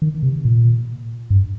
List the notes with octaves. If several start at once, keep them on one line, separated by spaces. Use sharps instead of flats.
D#3
C3
A#2
G2